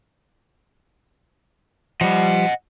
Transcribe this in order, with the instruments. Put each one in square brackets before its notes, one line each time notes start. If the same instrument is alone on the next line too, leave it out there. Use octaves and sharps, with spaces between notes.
[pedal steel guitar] F3 G3 [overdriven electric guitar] D#5 F#5